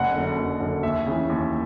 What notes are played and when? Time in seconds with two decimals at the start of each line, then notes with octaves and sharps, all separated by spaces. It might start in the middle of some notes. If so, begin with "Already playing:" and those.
Already playing: F#1 F#5
0.14 F#2 D3
0.38 F#1
0.60 F#2 D3
0.83 D#2 E5
1.06 C#3 E3
1.29 D#2